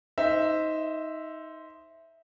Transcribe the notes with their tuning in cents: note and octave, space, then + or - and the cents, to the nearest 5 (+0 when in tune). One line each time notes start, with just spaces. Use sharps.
D#4 +20 C5 -5 E5 +0